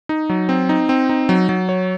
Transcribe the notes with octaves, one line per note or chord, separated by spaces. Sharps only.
D#4
F#3
C4
D#4
C4
D#4
F#3
F#3
C#5